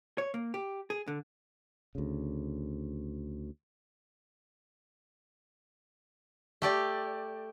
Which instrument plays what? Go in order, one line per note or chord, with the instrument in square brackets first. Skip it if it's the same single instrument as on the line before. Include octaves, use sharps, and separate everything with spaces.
[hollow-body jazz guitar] C#5
A#3
G4
G#4
D3
[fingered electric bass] D2 C#3
[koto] A3 G4 D5